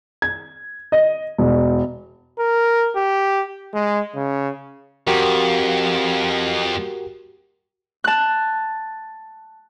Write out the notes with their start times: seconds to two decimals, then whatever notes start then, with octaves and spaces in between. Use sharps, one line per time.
0.22 G#6
0.92 D#5
1.38 E1
2.39 A#4
2.96 G4
3.74 G#3
4.16 C#3
5.07 F2 F#4 G4 A#4
8.04 A5 F#6